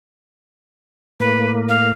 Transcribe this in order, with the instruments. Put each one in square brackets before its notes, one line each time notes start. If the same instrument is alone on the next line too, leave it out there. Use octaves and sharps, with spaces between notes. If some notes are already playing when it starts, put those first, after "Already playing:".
[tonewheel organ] A2 A#3 [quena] B4
[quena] F5